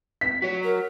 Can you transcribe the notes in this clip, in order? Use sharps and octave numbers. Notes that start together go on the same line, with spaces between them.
B6
F#4 C#5
A#4